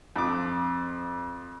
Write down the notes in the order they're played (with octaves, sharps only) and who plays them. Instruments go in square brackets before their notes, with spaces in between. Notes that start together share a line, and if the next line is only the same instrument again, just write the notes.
[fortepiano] F2 D6